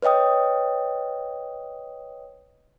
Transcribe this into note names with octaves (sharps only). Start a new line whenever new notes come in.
B4 C#5 D#5 G5 D#6